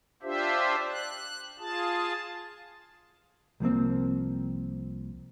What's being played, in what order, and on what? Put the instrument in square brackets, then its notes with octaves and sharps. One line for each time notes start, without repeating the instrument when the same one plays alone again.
[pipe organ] D4 F4 G4 C5 E5
F#6
F4 G#4 A5
[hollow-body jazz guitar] C2 F3 A#3 C4